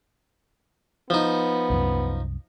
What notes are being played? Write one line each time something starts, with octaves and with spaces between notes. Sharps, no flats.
F3 B3 D#4
C2 F#2